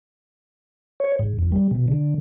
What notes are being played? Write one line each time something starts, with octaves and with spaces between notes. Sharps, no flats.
C#5
G#2
F2
G3
B2
D3